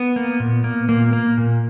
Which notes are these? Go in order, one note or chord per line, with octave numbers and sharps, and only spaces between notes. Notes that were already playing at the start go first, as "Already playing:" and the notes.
Already playing: B3
A#3
A#2
A#3
A#2 A#3
A#3
A#2